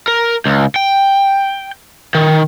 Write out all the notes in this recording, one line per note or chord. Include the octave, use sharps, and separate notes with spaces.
A#4
C#2
G5
D#3